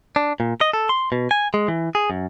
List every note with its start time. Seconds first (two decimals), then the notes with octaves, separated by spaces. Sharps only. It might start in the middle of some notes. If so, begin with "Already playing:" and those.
0.16 D4
0.40 A#2
0.61 D#5
0.73 A4
0.89 C6
1.12 B2
1.31 G#5
1.54 G#3
1.68 E3
1.95 G#4
2.10 F#2